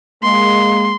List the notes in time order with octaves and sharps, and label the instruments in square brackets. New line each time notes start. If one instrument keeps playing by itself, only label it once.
[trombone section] G#3 A#3 [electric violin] C6